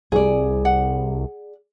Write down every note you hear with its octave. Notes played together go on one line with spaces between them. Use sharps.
C2 G#4 D5
F#5